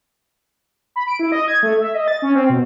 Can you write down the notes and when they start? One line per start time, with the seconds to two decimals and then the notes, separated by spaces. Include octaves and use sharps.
0.96 B5
1.08 D7
1.19 E4
1.32 D#5
1.48 G#6
1.63 A3
1.80 E5
1.94 D#5
2.08 A6
2.22 C#4
2.35 C4
2.49 B2